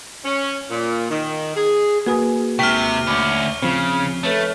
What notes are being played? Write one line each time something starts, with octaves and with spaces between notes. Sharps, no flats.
C#4
A#2
D#3
G#4
A#3 F#4 G#4 B4 G#5 D#6
D#2 C3 G#3 C#6 F6
D2 C#4 B5 D6
C#3 F3 C4
A3 A4 B4 C#5